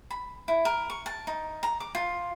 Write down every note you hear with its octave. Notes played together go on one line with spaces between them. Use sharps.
B5
E4
A#4
C#6
A5
D#4
A#5
D6
F4